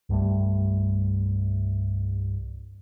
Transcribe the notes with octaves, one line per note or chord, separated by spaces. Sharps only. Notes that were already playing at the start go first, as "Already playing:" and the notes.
C2 G2 G3 A3